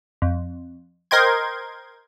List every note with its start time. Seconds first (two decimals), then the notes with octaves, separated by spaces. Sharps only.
0.22 F2
1.11 A#4 C5 D#5 G5 C6 G#6